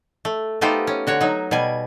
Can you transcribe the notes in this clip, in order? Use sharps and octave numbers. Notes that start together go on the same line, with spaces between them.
A3
A3 B3 D#4 F4 G4 C5
C#4
D3 F#4 C#5
F#3 D#4
B2 G3 G#5